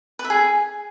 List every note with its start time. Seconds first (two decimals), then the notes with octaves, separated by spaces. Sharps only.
0.19 B4
0.25 E5
0.30 G#4